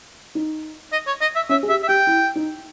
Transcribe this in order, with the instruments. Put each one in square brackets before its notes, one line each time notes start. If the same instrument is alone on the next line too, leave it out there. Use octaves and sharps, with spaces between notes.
[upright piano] D#4
[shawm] D#5
C#5
D#5
E5
[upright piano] C#4 [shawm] E5
[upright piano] G#4
[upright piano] G4 [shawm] E5
[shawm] E5
[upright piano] G4 [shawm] G5
[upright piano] E4
D#4